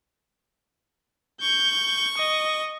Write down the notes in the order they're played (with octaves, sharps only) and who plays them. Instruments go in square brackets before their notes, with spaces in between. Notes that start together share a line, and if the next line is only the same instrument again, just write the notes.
[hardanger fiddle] C#6 [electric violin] G6
[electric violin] D#5